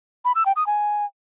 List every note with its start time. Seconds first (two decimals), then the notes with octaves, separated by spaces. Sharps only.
0.25 B5
0.35 E6
0.46 G5
0.56 D#6
0.67 G#5